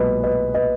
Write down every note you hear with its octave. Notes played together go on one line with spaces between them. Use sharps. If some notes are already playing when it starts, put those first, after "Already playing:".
Already playing: B1 A#2 G#3 B4 D#5
B4 D#5
B4 D#5